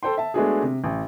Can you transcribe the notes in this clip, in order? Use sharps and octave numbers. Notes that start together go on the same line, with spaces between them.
A4 C5 G5 C6
E5 A5
G#3 A3 B3 D4 F#4 G#4
C3
A1